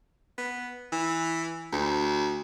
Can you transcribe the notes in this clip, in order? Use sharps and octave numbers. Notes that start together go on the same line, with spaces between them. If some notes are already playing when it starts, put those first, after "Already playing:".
B3
E3
D2